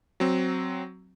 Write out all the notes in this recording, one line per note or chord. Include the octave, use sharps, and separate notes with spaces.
F#3 C4